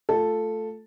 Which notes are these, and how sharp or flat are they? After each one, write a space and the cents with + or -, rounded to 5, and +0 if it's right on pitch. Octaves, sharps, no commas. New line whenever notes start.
A3 +0 F4 +0 A4 +0